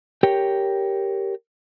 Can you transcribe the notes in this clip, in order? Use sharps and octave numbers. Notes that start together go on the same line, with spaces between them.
G4 A#4 C#5 G5